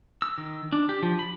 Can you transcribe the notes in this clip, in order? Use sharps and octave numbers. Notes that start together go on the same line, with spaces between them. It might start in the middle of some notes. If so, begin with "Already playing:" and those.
E6
D#3
D4
G4
F3
B5